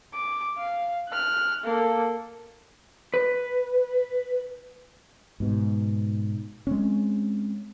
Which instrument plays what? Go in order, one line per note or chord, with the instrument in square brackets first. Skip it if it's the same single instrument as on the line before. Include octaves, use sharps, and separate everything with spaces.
[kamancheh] D6
F5
F6 F#6
A#3 A4
[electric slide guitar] B4
[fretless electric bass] G#2 B2
G#3 C4 C#4